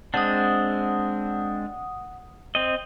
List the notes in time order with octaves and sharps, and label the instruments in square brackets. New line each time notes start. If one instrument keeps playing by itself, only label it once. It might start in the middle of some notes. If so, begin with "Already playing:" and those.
[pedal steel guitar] G#3 C4 D4 [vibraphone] F#5 D#6
[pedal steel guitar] C4 D#5